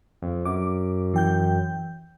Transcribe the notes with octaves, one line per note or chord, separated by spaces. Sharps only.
F2
F#2 D6
E3 G5 G6